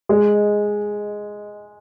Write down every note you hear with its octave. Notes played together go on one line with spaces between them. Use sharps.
G#3